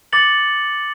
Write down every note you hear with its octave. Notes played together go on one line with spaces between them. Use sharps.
D6 A6 C#7 F#7